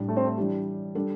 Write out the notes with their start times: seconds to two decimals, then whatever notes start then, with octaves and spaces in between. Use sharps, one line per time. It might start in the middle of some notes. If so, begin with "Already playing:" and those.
Already playing: A2 G3 D4
0.08 A3
0.17 C4
0.24 A3
0.38 E3 G3 D4 G4
0.95 G3 D4 A4